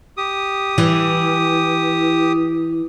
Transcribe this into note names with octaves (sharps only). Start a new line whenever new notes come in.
G4 D#6
E3